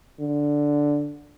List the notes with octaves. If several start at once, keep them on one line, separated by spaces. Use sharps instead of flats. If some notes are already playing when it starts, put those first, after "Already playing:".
D3